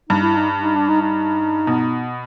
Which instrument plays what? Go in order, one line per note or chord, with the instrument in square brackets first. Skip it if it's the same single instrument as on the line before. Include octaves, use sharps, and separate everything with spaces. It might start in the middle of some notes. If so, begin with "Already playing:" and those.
[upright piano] G2 [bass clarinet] D#4
[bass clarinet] E4
D#4
D#4
D4
D#4
D#4
[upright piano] B2